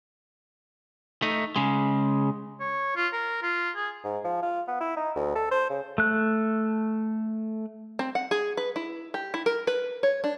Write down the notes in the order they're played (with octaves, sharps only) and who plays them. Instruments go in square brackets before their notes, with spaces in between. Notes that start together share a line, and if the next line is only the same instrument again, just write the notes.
[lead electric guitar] A3 D#4
C#3 G#3
[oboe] C#5
F4
A#4
F4
G#4
[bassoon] G#2
F3
F4
B3
E4
D#4
D2
A4
C5
C#3
[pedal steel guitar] A3 F#6
[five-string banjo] C4
F#5
G#4
B4
E4
G4
E4
A#4
B4
C#5
D4